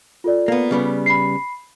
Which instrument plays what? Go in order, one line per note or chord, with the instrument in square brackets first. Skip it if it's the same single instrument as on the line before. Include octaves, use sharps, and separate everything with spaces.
[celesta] F4 A4 D5
[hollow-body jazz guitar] A#3 B3
C#3 G3 B3
[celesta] B5 C7